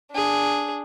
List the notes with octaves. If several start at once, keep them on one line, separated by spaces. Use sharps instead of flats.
D4 G#4